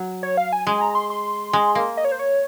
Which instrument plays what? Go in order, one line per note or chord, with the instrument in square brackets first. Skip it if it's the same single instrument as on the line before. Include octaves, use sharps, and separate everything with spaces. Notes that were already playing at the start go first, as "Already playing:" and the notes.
Already playing: [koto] F#3
[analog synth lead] C#5
F5
G#5
[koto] G#3 [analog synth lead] G#5
[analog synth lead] A#5
C6
C6
[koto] G#3
A#3
[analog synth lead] D#5
C#5
C5
C#5